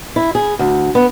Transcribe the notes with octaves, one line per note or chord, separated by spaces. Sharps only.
E4
G#4
D2
B3